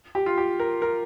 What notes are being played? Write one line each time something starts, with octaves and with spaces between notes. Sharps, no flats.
G4
F4
G4
A#4
A#4